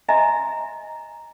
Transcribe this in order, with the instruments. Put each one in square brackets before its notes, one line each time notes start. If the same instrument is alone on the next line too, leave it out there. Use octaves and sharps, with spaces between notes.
[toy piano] D#5 E5 G#5 A#5 C6